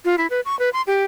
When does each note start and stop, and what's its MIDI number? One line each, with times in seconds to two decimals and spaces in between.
0.05 0.16 65
0.18 0.27 64
0.30 0.40 71
0.45 0.58 85
0.59 0.70 71
0.73 0.82 84
0.87 1.04 67